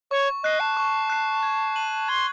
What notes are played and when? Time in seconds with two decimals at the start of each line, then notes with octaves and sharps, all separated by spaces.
0.11 C#5 C#6
0.44 D#5 F#6 C7
0.60 A5
0.77 C#6
1.10 F#6 C7
1.43 G#6
1.76 D#7 F#7
2.08 C6 G#6